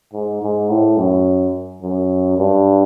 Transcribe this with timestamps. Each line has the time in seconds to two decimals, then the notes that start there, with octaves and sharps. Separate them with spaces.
0.13 G#2
0.41 G#2
0.70 A2
0.98 F#2
1.82 F#2
2.38 G2